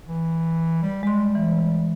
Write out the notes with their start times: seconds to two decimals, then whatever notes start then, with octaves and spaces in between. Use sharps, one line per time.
0.07 E3
0.82 G3
1.03 G3 G#3 C6
1.35 E3